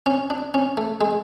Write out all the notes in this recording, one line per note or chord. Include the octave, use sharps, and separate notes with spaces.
C#4
D4
C#4
A3
G#3